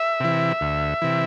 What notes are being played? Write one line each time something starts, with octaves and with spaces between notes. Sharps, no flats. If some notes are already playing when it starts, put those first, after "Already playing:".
Already playing: E5
C3 E3
D2
C3 E3